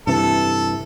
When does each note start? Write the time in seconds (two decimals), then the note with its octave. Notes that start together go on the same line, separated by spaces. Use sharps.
0.07 G2 C3 E3 A4